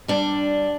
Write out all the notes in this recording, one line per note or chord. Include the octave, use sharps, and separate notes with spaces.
G3 D4